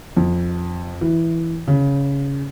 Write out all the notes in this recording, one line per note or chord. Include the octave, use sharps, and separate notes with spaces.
F2
E3
C#3